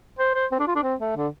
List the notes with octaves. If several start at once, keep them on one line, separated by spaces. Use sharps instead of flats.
C5
C5
C4
D4
F4
D4
C4
A3
D3